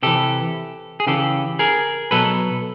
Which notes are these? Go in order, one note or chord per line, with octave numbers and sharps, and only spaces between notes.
C3 E3 G4 A4
G#4
C#3 E3 G4 A4
G#4 A#4
B2 F#3 A4 B4